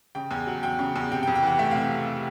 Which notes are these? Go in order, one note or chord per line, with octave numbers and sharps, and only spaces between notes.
C#3 G5
E2 G#5
F#3 F#5
E2 G5
C#3
E2
C3 G5
G5
F2
G5
E3 F#5
A3 E5
F5
C3